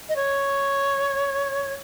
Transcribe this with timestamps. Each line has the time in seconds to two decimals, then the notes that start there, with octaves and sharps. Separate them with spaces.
0.09 D#5
0.16 C#5